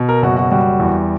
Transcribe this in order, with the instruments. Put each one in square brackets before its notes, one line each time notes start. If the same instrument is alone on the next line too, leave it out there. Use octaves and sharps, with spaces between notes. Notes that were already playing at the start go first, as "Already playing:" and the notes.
Already playing: [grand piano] B2
A#4
F#1 F#4
F#4
G3 F#4
E2